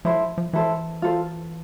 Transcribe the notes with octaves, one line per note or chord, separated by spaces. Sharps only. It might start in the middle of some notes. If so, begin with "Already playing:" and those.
F3 E4 A4 C5
F3
E3 E4 A4 C5
F4 A4 C5